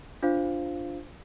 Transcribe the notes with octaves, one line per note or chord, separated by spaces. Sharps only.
D4 F4 C5 F5